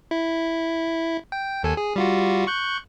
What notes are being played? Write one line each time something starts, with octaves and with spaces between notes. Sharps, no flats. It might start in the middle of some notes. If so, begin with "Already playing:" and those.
E4
G5
D#2 A4 G#5
G#4
G3 F4 F#4
C#6 F#6 G6